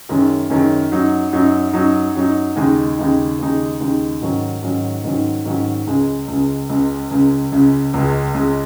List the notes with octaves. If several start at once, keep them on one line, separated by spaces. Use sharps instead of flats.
F#2 D#3 G#3 C#4
F#2 D#3 G#3 C#4
F#2 F#3 D#4
F#2 F#3 D#4
F#2 F#3 D#4
F#2 F#3 D#4
D#2 C#3 G#3 D#4
D#2 C#3 G#3 D#4
D#2 C#3 G#3 D#4
D#2 C#3 G#3 D#4
G#2 D#3 F#3 C#4
G#2 D#3 F#3 C#4
G#2 D#3 F#3 C#4
G#2 D#3 F#3 C#4
C#2 C#3 G#3
C#2 C#3 G#3
C#2 C#3 G#3
C#2 C#3 G#3
C#2 C#3 G#3
C#2 C#3 G#3
C#2 C#3 G#3